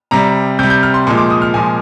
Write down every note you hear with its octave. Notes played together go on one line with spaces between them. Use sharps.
C3 G3 A#5
C3 G3 G6
G6
F6
C6
A#2 F3 G#3 C6
D6
D#6
F6
A#2 F3 G#3 G#5